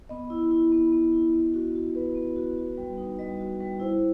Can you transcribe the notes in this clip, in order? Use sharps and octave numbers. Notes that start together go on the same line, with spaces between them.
B3 D#5
E4
E4
B3
B3
E4
B3
F#4
F#4
B3 B4
B3
F#4
F#4
G3
D#4
G3 D#5
F#4
G3
E4 C5